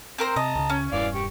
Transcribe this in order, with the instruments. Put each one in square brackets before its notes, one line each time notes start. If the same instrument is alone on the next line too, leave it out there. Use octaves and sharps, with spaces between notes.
[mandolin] C4 A#4 C5
[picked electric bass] C3 [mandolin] D#5 [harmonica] A5 A#5
[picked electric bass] C#2 C#3
[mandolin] C#4
[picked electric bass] E1 G2 [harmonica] E3 D5 F5
[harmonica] G4 C#6